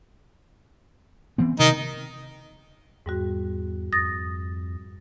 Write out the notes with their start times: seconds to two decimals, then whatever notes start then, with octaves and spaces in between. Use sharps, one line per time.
1.38 E3 B3 C4
1.59 C3 D#3 D#4
3.06 E2 G#2 G3 F#4
3.93 F2 D#6 A6 A#6